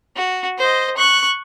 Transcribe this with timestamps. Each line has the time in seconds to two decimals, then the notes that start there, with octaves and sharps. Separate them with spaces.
0.16 F#4
0.58 C5 D#5
0.97 C#6 F#6